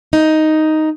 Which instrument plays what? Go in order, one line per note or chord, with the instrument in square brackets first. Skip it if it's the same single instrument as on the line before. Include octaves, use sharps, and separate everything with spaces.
[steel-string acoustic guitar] D#4